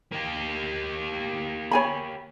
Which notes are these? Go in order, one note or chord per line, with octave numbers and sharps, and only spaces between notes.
A#3 G4
C#5 G#5 B5